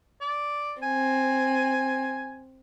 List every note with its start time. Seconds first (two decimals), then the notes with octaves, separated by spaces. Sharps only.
0.21 D5
0.83 C4 G#5